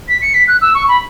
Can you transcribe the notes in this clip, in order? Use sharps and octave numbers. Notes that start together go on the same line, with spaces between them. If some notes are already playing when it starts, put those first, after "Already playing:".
B6
C#7
B6
F#6
E6
C#6
B5